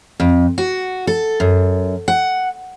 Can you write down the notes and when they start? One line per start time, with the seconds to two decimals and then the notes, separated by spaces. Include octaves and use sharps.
0.20 F2
0.58 F#4
1.07 A4
1.40 F#2
2.08 F#5